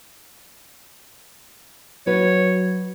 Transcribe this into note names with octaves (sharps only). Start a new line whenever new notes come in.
F#3 F#4 B4 C#5